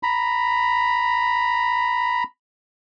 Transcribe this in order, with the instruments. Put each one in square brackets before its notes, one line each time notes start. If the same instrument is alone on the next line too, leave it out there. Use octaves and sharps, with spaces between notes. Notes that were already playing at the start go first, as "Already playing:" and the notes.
[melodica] A#5 B5